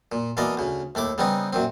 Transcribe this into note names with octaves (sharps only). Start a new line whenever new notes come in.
A#2
B2 E3 A#3 D5 D#5
D2 C#3
D#2 A3 E4 D6
C#3 G3 B3 C4 D#4
F#2 A#2 C4